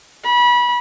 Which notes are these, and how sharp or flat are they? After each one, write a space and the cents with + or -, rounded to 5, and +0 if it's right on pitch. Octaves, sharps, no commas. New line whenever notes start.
B5 -25